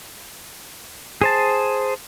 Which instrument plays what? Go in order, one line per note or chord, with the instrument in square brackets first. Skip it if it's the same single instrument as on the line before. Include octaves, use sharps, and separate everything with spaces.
[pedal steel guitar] G#4 C5 A5